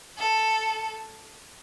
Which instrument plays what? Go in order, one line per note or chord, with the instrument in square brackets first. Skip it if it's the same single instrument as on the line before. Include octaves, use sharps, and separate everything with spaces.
[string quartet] A4